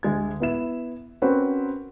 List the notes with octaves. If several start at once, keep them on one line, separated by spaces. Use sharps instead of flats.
D2 G#3 G#6
B3 E4 E7
C4 C#4 F#4 A#4 B4